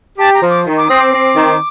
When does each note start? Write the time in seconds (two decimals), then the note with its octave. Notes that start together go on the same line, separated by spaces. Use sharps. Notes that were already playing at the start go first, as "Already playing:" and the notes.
0.18 G4 A5
0.34 A#5
0.42 F3
0.50 D6
0.66 D#3
0.77 D6
0.88 C4 D#6
1.01 D6
1.13 C4
1.36 D#3